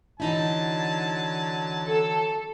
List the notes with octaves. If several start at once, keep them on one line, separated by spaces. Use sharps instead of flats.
D3 E3 F#3 D#4 E4 A5
A4